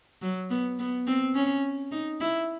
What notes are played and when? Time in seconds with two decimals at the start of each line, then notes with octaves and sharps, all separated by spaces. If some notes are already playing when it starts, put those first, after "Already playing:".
0.22 F#3
0.50 B3
0.79 B3
1.07 C4
1.35 C#4
1.92 D#4
2.20 E4